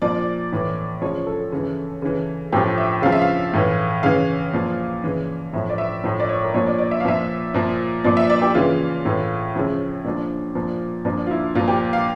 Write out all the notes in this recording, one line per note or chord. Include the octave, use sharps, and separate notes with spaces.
A#2 F3 D5
A2 E3
C#3 F3 C#5
A4
C#3 E3
C#3 E3
A2 F3 G4
E5
C#3 F3 F5
E5
F5
A2 E3
C#3 E3 F5
A#2 F3
C#3 E3
A2 F3 E5
D5
E5
A2 F3 E5
D5
C#5
A#4
A#2 F3 C#5
D5
D5
E5
F5
A#2 F3 E5
A#2 F3
A#2 F3 D5
E5
D5
G4
C#3 E3 F4
A2 E3
C#3 F3 E4
A#2 F3 D4
A#2 F3
A#2 F3 D4
F4
E4
A#2 F4
F3
G4
F5